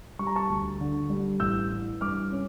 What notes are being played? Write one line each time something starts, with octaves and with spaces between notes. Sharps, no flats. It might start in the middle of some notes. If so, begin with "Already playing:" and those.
G3 C#6
A#5
A5 C#6
D2
D3
G3
A1 E6 G6
E3
G2 D6 F6
C#4